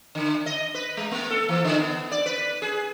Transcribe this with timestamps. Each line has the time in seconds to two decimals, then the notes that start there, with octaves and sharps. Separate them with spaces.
0.15 D3
0.46 D#5
0.74 B4
0.97 G#3
1.11 A#3
1.31 A4
1.49 E3
1.64 D3
1.78 B3
2.12 D5
2.26 B4
2.62 G#4